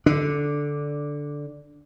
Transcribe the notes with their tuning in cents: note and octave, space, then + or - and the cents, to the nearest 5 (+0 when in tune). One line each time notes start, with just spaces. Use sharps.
D3 -5 D4 +0